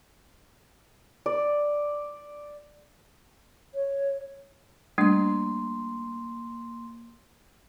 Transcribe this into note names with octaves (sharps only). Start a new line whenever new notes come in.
D5
C#5
G3 A3 A#3 D4 C6